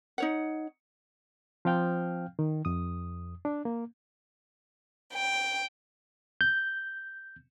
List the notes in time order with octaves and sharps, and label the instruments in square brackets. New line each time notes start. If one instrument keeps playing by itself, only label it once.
[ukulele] D#4 C#5 F#5
[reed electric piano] F3 C4 F5 G5 F6 G6
D#3
F2 D#6
D4
A#3
[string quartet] G5
[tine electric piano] G6